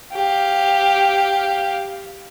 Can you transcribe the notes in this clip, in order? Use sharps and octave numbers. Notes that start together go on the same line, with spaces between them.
G4 F5